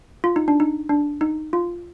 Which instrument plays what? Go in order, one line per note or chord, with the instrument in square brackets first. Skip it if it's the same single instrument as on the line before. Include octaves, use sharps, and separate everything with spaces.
[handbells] F4
D#4
D4
D#4
D4
D#4
F4